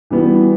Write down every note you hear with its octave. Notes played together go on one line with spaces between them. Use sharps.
E3 G3 B3 F#4